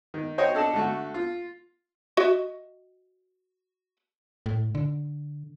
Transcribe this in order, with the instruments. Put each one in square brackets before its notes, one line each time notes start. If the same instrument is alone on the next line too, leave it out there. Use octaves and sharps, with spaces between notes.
[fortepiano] D#3
F#4 C5 C#5 D#5 G5
D4 A4 D#5 A5
D3 A3 F#4
F4
[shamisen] F#4 D#5 E5
[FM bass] A2
D3